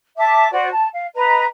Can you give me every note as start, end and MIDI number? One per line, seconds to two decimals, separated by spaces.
0.17 0.47 76
0.17 0.47 81
0.17 0.47 86
0.52 0.67 66
0.52 0.67 72
0.52 0.67 74
0.71 0.88 81
0.93 1.06 77
1.14 1.44 71
1.14 1.44 75
1.14 1.44 82